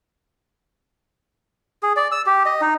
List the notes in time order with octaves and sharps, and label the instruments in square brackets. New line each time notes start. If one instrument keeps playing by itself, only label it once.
[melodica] G#4
D5
E6
G4
D#5
D#4